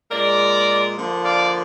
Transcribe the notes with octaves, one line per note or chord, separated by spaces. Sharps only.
A#2 G#3 A#4 D5
D3 F3 A#3
D5 F5